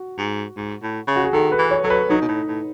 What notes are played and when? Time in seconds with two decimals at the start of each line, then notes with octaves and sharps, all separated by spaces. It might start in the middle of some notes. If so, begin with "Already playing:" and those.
Already playing: F#4
0.18 G#2
0.57 G#2
0.82 A2
1.08 C#3
1.16 F#4
1.24 G#4
1.33 D#3 A4
1.52 B4
1.58 E3
1.71 C#5
1.84 F#3 A4
1.90 B4
2.09 F#3 D#4
2.21 B2
2.28 A2
2.48 A2